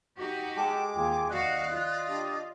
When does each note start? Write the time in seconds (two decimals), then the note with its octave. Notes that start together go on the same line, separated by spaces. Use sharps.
0.19 D#4 F#4 G4
0.56 G#3 A4 G5 A5 D6
0.95 D#2 F4 G#4 G5
1.30 D#2 F#4 D5 D#5 F5 F#6
1.71 F4
2.06 D4 G4